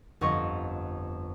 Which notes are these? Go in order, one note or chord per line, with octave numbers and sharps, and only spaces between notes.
G1 F2 D#5 C#6